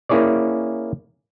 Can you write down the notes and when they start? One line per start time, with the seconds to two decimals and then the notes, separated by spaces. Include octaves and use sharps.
0.09 A#3 C#4 E4 G#4 C#5 D5